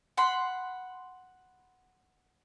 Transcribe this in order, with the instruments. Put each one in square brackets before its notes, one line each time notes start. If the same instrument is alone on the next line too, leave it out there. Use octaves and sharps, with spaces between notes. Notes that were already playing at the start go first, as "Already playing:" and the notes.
[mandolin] F#5 B5 C6